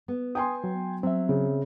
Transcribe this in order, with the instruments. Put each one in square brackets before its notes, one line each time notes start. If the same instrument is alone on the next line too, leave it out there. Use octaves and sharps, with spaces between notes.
[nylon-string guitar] B3
[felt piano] G5 G#5 C6 [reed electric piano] D#6
[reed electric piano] F#3
[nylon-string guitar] F#3 [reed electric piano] C4 E5
[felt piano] C#3